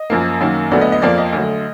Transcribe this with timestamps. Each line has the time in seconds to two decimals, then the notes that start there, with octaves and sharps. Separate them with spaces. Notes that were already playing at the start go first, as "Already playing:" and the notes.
Already playing: D#5
0.10 F#2 F3 A#3
0.41 F#2 D#3 F#3 A#3
0.71 D2 D3 F#3 B3 D5
0.81 D#5
0.92 D#5
1.02 F2 F3 A#3 D5
1.18 D#5
1.33 D2 D3 F#3